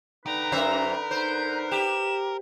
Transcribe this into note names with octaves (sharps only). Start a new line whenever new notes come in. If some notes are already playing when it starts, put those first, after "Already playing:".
C2 D3 D#4 G4 B4 A#5
F#2 A#4 C5 E5
C5 G6
G4 E7